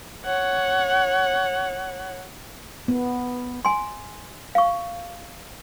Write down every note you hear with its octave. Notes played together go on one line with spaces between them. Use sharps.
C#5 F#5
B3
G#5 C6
F5 C#6